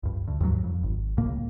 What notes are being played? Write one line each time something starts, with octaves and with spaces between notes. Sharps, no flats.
C#2 G2
D2
D#2 G#2 E3 F#3
F2
G#1
C#2 A2 A#3